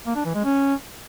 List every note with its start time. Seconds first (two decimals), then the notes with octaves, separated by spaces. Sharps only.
0.06 A#3
0.16 D4
0.25 E3
0.35 G#3
0.44 C#4